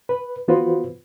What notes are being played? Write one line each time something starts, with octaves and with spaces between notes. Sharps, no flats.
B4
E3 B3 F4 F#4 B4 C5